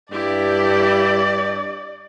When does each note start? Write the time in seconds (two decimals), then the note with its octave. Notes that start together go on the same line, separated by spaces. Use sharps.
0.12 G2 E4 G4 D5